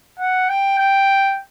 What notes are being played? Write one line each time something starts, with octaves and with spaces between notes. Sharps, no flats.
F#5
G5
G5